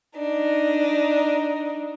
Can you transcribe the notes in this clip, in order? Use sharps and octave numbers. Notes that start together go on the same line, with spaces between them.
D4 D#4